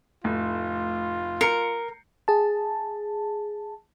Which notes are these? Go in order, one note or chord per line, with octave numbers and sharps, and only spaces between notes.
F1 A2 F4
A#4 C7 C#7
G#4 A5